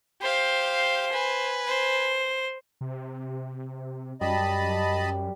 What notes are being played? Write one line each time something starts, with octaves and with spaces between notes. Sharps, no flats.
G4 C5 F5
B4 G#5
C5
C3
F#2 G3 D#5 A5 B5